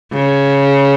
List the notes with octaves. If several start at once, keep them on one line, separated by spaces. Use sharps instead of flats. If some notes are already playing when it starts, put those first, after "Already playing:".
C#3